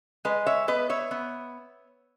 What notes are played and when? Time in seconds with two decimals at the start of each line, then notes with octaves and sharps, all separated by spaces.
0.25 G#3 B4 D#5
0.46 C#5 E5
0.68 B3 B4 D#5
0.90 C#5 E5
1.11 B3